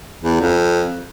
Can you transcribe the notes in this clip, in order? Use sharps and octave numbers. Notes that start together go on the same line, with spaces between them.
E2
F2